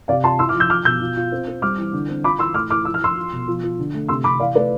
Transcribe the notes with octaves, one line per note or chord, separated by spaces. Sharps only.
C3 D5 F5
F4 A5 C6
E4 C6 E6
D6 F6
F3
E6 G6
F4 D6 F6
B2 E6 G6
F4
F4
C4
C4
G3 D6 F6
E3
D3
C4
F4 B5 D6
E3 C6 E6
A2 D6 F6
E3 D6 F6
F3 E6
F6
F3 C6 E6
F4
B2
F3
F3
D3
A3
C3 C6 E6
C3 B5 D6
E3 D5 F5
A3 B4 D5